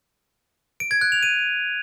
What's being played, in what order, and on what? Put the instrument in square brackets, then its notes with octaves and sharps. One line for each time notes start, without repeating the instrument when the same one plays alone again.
[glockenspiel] D7
G#6
F#6
F7
D#7